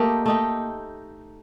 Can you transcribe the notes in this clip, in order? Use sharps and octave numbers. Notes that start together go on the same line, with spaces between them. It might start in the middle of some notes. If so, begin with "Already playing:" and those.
Already playing: A3 A#3 D#4 G4
A3 D#4 G4